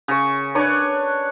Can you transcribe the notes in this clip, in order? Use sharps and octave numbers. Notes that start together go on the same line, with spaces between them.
C#3 C#6
D4 B4 C#5